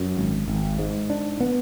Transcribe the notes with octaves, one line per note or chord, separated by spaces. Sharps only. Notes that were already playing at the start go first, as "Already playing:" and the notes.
Already playing: F#2
G#1
G#1
G#2
D4
B3